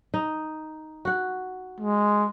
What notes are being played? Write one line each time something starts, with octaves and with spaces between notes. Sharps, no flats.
D#4
F#4 F#5
G#3